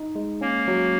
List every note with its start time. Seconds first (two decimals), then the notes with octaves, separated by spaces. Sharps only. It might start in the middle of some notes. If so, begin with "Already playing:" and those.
Already playing: D#4
0.15 G#3
0.41 A#3 C#4
0.68 F#3